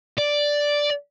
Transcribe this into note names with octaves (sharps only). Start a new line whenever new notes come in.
D5